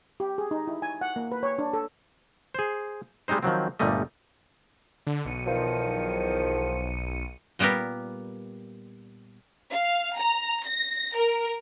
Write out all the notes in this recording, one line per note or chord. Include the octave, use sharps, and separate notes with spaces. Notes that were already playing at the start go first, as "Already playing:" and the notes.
G4
G#4
D#4
E4
G#5
F#5
A#3
B4
C#5
D4
A4
G#4 C5
G3 G#3 C4 D#4 C5
D#3 F3 F#3 C4
G1 A#2 G3 A3 D#5
D3
B1 C#7 D#7
E2 D#3 F3
A#2 G3 B3 G4 A#4
F5
A#5
A#6
A#4